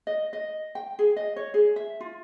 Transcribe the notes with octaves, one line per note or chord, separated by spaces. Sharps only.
D#5
D#5
G5
G#4
D#5
C#5
G#4
E5
F4